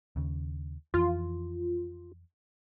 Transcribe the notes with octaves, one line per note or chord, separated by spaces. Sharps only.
D#2 C#3
F2 E3 F4